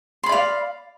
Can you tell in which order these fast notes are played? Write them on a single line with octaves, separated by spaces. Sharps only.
C6 B5 D5 F5